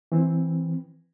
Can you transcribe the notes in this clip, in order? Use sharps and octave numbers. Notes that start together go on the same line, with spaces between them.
E3 C4